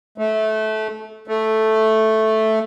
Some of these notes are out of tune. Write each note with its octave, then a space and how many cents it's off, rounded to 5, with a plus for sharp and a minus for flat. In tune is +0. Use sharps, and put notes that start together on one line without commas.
A3 -20
A3 -5